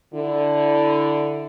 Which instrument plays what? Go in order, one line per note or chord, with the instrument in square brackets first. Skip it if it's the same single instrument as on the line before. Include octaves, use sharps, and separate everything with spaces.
[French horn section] D3 E4